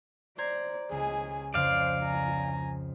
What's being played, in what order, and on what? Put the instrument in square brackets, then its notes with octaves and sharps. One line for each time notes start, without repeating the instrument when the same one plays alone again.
[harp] C5 A#5 G#6 [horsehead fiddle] D5
[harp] C#2 [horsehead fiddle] G#4 G#5
[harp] F2 C#3 [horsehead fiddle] C5 [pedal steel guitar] D5 F5
[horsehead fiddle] G#5 A#5